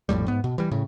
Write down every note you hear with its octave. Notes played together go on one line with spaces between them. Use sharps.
A#1 F2 A2 G3
G#2 B3
B2
E3 G3
A2 C#3